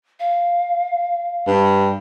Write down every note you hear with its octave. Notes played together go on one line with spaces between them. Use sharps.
F5
G2